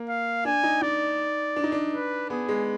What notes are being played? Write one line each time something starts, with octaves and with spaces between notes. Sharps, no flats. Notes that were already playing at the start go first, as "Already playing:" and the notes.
Already playing: A#3
F5
D4 G#5
D#4
D#4 D5
D4
D#4
D4
B4
B3 G#4
G#3